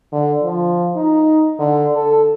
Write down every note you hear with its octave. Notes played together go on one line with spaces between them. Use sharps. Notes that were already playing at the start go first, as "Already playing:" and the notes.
D3
F3
D#4
D3
A4